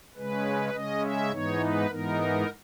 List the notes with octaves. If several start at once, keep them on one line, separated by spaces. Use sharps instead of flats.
C#3 G#3 C#4 B4
C#3 G#3 C#4 D#5
E5
G#2 E3 B3 D#4 C#5
B4
G#2 E3 B3 D#4 A#4